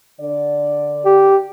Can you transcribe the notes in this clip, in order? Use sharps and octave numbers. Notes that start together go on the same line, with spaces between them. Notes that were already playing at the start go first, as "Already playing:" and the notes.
D3 D5
G4